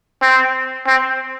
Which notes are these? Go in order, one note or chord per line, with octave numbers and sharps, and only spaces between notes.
C4
C4